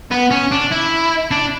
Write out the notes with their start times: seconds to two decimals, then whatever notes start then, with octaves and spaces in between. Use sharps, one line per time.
0.11 B3
0.31 C#4
0.51 D4
0.71 E4
1.31 D4